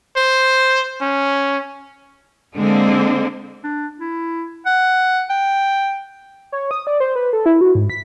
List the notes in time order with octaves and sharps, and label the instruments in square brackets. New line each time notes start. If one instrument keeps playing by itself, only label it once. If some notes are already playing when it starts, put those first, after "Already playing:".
[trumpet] C5
C#4
[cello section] D3 G#3 A#3 C4
[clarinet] D4
E4
F#5
G5
[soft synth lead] C#5
D#6
D5
C5
B4
A4
E4
F#4
G#2
B6